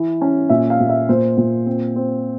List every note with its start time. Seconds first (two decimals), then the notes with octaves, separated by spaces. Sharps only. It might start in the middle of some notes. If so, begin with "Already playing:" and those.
Already playing: E3
0.21 C#4
0.49 A#2 E5
0.70 F5
0.80 A#2
0.89 E5
1.09 A#2 C5
1.38 A#2
1.66 C4
1.96 C4